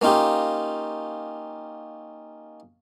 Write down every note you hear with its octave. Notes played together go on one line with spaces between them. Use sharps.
A#3 C#4 D#4 F4 G4